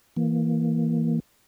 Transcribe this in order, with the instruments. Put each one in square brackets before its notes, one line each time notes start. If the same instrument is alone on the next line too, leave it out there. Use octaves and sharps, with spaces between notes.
[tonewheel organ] E3 A#3